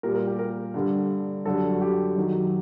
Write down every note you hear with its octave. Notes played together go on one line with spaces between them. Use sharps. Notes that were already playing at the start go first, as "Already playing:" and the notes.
A#2 G3 A#4
A#4
G4
A#4
G2 D3 G3
F#2 D3 G3 A4
F#4
G4
F#2 D#3 F#3